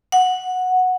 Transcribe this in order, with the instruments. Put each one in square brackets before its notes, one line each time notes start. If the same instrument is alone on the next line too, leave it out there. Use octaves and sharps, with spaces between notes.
[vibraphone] F#5